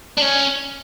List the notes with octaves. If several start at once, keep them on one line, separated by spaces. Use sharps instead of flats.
D4
C#4